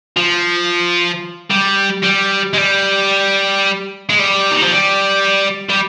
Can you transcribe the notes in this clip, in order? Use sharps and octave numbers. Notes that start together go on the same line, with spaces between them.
F3
G3
G3
G#3
G3
G#3
G3
D#3
F3
G3
G3